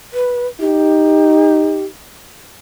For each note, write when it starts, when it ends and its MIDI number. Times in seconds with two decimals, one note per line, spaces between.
0.14 0.47 71
0.60 1.90 63
0.60 1.84 67